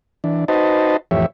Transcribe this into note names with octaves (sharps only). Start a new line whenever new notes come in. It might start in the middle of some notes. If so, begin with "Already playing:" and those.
E3 D4
D#4 F#4 B4 C5 D#5 A5
F2 A2 E3 G4 C#5 E5